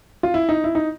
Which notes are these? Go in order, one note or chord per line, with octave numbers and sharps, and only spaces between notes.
F4
E4
D#4
E4
D#4